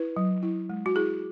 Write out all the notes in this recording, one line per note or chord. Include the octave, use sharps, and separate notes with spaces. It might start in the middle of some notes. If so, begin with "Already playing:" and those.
Already playing: E4 B4
F#3
E4
G#3
F#4
E4 G#4